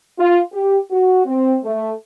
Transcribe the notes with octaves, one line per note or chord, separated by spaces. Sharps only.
F4
G4
F#4
C4
A3